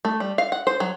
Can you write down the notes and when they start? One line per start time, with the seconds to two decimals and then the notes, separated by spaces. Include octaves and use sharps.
0.05 A3
0.20 G3
0.38 F5
0.52 F#5
0.67 C5
0.80 F#3